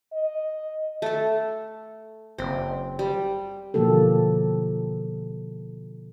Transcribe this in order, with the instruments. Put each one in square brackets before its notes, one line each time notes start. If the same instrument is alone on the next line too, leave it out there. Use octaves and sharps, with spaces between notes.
[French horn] D#5
[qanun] A3 A4
[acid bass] F#1 [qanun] C4
[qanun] G3
[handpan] B2 D3 F3 A#3 G4 A4